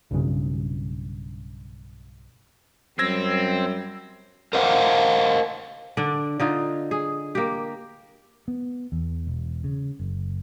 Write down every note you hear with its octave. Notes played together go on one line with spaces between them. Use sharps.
B1 G2 C#3
F#2 G3 C4 E6 G#6 A#6
A#4 C5 D#5 F5 F#5
D3 D4 D5
D3 D#4 F4
G#4
A#3 G4
B3
E2
E1
C#3
F#1